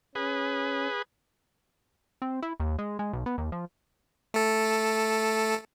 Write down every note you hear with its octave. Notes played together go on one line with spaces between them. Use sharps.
C#4 G#4 B4
C4
E4
D#2
G#3
G#3
B1
B3
D#2
F3
A3 A4